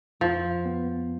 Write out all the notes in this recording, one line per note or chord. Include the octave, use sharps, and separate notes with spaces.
F2 F3
B3